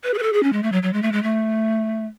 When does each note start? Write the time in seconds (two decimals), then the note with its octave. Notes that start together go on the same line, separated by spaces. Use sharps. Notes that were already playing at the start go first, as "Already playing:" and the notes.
0.04 B4
0.14 G#4
0.18 B4
0.23 A4
0.33 G#4
0.43 C#4
0.53 G#3
0.63 A3
0.72 F#3
0.83 F#3
0.93 G#3
1.02 A3
1.12 G#3
1.23 A3